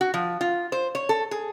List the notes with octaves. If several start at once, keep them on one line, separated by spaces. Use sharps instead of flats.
F#4
F3
F4
C5
C#5
A4
G#4